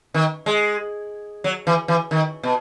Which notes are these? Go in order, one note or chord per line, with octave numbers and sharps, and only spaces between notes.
D#3
G#3
F#3
E3
E3
D#3
B2